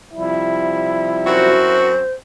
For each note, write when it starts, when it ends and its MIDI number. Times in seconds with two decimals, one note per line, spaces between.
0.13 1.52 48
0.13 1.52 53
0.13 1.52 55
0.13 1.93 64
1.27 2.03 42
1.27 2.03 60
1.27 2.03 66
1.27 2.11 72